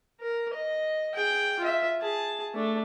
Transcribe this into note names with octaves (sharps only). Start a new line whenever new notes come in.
A#4
D#5
G#4 G5
F4 E5
G#4 A5
A3 D4